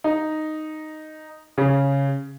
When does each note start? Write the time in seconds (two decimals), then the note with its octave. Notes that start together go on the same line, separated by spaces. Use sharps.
0.04 D#4
1.58 C#3